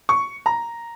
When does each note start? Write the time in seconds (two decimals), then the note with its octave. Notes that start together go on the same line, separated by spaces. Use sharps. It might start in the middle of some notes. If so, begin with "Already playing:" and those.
0.09 C#6
0.46 A#5